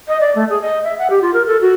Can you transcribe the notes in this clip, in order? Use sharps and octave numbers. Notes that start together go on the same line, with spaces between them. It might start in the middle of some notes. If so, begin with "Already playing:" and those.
D#5
D5
A3
G#4
D#5
E5
F#5
G4
F4
A#4
A4
F#4